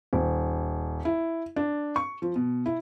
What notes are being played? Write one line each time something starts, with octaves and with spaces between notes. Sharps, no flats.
D#1
E4
D4
C#6
F3
B2
E4